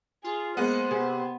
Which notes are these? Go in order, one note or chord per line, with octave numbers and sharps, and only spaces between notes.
F4 G#4
G#3 A#3 B3 C5 F#6 C#7
C3 B3 G#4